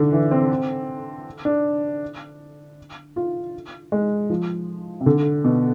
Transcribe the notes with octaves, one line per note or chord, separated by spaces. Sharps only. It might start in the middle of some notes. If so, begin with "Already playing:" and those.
Already playing: D3
E3
C4
D4
F4
G#3
F3
C3
D3
B2